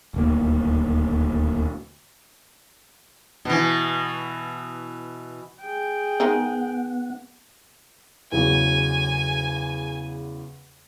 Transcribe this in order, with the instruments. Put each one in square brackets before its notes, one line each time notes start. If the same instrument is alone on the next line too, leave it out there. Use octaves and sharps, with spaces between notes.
[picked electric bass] D#1 D2 A#3
[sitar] B2 E3
[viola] G#4 G5
[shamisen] D#3 G#3 D#4 [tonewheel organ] B3 F#5
[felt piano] E2 C#3 F#3 [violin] G#5